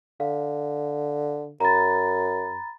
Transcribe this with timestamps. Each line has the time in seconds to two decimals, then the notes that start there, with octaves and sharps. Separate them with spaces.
0.20 D3 F5
1.60 F#2 A#5 B5 A6